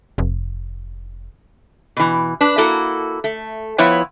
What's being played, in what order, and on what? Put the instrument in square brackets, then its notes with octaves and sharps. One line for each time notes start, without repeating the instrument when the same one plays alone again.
[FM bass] F1
[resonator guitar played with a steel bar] B2 E3
D4 B4
A#3 E4 F#4 A4
A3
F3 B3 E4 B4 C#5 G5